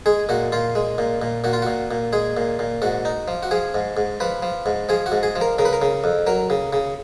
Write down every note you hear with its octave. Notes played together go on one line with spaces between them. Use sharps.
G#3 G#4
A#2 F#4
A#2 F4
G#3
A#2
A#2
A#2 F#4
F4
A#2 F#4
A#2
G#3 G#4
A#2
A#2
G#2 F#4
D#4
F3
F#4
F3 G#4
G#2
G#2
F3 B4
F3
G#2
F3 G#4
F#4
G#2
G#4
F3
A#4
C#3 A#4
B4
A#4
C#3
F2
F#3 A#4
C#3
C#3